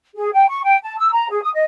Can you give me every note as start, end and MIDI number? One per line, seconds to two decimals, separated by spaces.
0.15 0.28 68
0.33 0.46 79
0.48 0.61 85
0.64 0.76 79
0.82 0.95 81
0.98 1.09 88
1.12 1.28 82
1.29 1.41 68
1.42 1.49 87
1.54 1.63 75